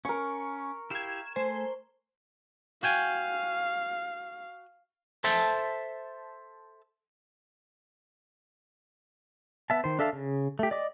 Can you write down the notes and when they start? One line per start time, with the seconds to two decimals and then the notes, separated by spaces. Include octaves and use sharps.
0.05 C#4 A#4 C#6
0.90 E4 G4 F5 G#6 E7
1.36 A3 C5 G#5
2.83 F#4 F5 G5 G#5
5.24 A4 C5 E5 A5
9.70 B3 E5 A5
9.84 D#3 C5
9.99 D4 A4 E5 F5 A5
10.13 C#3
10.59 A3 G4
10.71 D5 D#5 D6